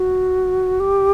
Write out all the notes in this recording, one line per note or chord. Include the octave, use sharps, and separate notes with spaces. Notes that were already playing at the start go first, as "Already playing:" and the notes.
Already playing: F#4
G4